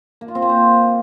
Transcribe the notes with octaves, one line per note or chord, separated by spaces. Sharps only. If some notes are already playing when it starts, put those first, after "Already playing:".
A#3
F4
C4
A#3
C5